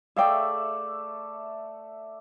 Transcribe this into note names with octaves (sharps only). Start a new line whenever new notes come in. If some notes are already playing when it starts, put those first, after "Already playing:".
A3 G#4 D5 E5 F5 G5